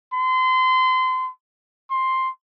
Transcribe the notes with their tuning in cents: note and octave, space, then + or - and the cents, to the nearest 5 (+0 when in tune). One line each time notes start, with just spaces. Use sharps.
C6 -30
C6 +5